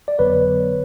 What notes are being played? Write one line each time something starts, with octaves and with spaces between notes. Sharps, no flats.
D5
G1 F2 D3 F#3 B3 B4 C#5